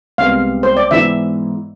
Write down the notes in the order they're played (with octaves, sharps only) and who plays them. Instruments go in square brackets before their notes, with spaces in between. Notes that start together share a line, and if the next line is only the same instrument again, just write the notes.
[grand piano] C2 C3 G#3 B3 [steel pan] F5
[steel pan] C5
D5
[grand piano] G#2 E3 G#3 B3 E4 [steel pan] E5